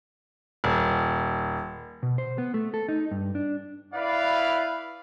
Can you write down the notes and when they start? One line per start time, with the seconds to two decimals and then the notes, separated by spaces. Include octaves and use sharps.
0.64 D#1
2.03 B2
2.18 C5
2.38 B3
2.54 A3
2.74 A4
2.89 D#4
3.11 G2
3.35 D4
3.94 E4 B4 D5 F5